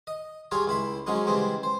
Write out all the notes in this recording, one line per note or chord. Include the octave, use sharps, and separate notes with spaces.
D#5
G3 F4 G#4 C#5 A#5
C#2 E4 B5 C6
F3 F#3 G#3 C#4 D#4
C#3 E3 G3 G#3 C4
C5